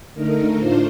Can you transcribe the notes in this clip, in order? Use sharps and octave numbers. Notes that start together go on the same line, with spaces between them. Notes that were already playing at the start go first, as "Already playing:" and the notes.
D3 A3 D#4 A#4
A2 A3 D4 F4 C5